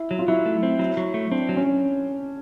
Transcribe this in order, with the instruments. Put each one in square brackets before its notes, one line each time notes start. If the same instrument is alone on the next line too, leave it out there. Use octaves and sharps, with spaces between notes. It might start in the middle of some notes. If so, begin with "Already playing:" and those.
Already playing: [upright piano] E4
[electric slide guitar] F#3
[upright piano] F4
[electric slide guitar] F#3 [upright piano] E4
[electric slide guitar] A3
C4
[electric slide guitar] F#3 [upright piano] E4
[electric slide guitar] F#3
A3
[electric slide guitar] C4 [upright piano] D4
[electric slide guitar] F#3
[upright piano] C#4